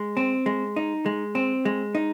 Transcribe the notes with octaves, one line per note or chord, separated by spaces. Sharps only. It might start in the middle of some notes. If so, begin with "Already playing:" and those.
Already playing: G#3
C4
G#3
D#4
G#3
C4
G#3
D#4